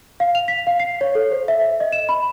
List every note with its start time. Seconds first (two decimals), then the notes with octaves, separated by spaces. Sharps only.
0.20 F5
0.35 F7
0.48 B6
0.67 F5
0.80 C7
1.01 C#5
1.15 A4
1.32 C5
1.48 E5
1.80 D#5
1.92 E7
2.09 B5